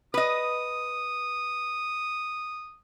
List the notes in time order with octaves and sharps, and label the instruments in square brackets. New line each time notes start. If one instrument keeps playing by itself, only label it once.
[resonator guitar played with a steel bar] B4 D#5 [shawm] D#6